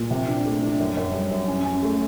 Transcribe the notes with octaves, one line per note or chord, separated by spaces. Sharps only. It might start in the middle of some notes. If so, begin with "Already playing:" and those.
Already playing: A#2
C3
D4
A3
D4
F#2
F#2
G3
F#2
C#4
C#4
A3